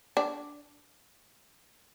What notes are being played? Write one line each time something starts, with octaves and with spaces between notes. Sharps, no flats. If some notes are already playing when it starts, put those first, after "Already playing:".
D4